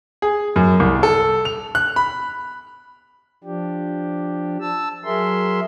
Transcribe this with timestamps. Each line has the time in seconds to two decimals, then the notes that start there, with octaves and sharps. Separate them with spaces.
0.22 G#4
0.56 F#2
0.80 C2
1.03 A4
1.45 F7
1.75 F#6
1.96 B5
3.44 F3 D4 G4
4.61 A5 E6
5.05 F#3 G#4 A#4 E5 C6